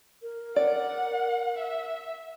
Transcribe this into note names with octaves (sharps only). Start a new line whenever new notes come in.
A#4
D5 F#5
E5